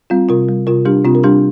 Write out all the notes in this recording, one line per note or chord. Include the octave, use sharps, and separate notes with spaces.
G3 C4 F4
C3 F4 A#4
G3
C3 F4 A#4
G3 D4 G4
C3 C4 F4
A#4
G3 D4 G4